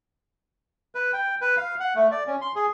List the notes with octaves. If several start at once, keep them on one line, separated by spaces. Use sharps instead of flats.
B4
G5
B4
F5
F#5
A3
D5
C#4
C6
G#4